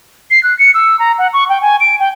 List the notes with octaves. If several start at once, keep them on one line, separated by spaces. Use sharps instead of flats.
C7
F#6
C#7
E6
A#5
F#5
C#6
G5
G#5
D7
G5